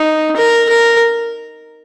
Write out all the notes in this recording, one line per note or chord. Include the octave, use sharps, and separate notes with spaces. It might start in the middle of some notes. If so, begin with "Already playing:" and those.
Already playing: D#4
A#4
A#4